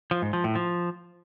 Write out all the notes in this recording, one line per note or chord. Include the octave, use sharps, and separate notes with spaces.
F3
G#2
F3
A2
F3